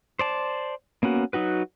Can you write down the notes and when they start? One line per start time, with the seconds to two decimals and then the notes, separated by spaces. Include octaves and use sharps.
0.19 C5 D5 A5
1.03 A#3 B3 C#4 F#4
1.33 F#3 D#4 F#4 B4